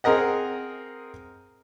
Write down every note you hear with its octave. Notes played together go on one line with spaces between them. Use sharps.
C4 G#4 A#4 D#5 F#5